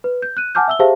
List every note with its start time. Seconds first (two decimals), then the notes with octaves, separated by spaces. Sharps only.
0.04 B4
0.22 G6
0.37 F#6 D#7
0.55 F#5 G#5 A5 D6 F6 G6
0.68 E5 E6 G7
0.79 G4 G#4 C5 E5 F5 A5